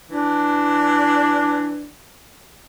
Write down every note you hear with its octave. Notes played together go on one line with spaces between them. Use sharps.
E3 D4